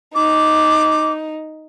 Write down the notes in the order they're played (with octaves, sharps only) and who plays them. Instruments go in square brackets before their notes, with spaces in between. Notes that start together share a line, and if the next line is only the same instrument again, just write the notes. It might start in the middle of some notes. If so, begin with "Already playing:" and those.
[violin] D#4 [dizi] D6